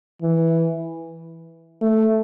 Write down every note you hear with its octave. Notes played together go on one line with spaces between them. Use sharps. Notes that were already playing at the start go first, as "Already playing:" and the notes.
E3
A3